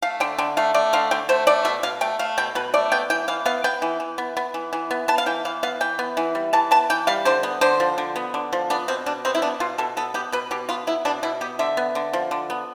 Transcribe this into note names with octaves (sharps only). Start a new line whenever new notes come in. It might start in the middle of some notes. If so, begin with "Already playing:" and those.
A3 F5
D3 G5
D3 G5
A3 F5
A3 D5
D3 F5
D3 G5
A3 C5
A3 D5
B2 E5
B2 F5
A3 G5
A3 F5
B2 G5
B2 B4
A3 D5
B3 G5
E3 G5
E3 F5
B3 F5
B3 G5
E3
E3
B3
B3
E3
E3
B3
B3 A5
F5
E3 G5
E3 F5
B3 F5
E3 G5
B3
E3
G3
E3 A5
B3 A5
E3 G5
G3 F5
D3 C5
B3
D3 C5
F3
D3
B3
D3
F3
B3 D4
B2 C4
B2 D4
B3 C4
E4
B3 D4
B2 F4
B2 A4
B3 A4
B3 G4
B2 B4
B2 G4
B3 F4
B3 E4
B2 D4
B2 E4
B3 G4
D3 E5
B3
D3
F3
D3
B3